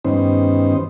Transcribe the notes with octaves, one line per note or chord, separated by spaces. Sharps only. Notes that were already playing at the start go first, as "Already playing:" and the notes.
G2 D#3 B3 C#4 D#4 C5